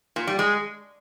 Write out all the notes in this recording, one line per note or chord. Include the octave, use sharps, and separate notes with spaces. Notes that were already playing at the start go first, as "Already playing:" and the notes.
A#2
G3
G#3